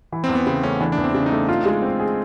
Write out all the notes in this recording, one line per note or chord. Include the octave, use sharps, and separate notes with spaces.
E3
C4
E2
B3
C#3 C4
A3 C#4
E3 D4
D4
E2
C4
C#3 D4
D#4
A3
F4
G#3
C4
G#4